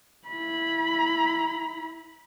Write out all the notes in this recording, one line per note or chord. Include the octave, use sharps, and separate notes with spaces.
E4 B5